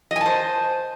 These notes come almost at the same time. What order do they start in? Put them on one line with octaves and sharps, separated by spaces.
D#5 G#5 A5 C5